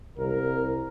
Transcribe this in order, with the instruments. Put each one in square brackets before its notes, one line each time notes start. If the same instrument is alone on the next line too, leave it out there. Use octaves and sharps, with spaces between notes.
[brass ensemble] C2 A#4